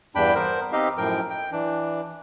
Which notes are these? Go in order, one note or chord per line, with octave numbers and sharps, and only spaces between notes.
E2 G2 D4 G5 B5
B3 A#4 C5
C4 D#4 G4 D#5 F5
F#2 A2 F3 A#4 G5
G5
E3 D4